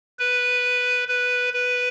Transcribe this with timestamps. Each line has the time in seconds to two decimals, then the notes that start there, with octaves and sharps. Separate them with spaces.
0.19 B4
1.08 B4
1.54 B4